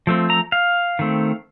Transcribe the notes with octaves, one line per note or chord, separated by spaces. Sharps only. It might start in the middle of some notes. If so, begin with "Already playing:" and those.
F3 A3 C4
A#5
F5
D#3 A3 C4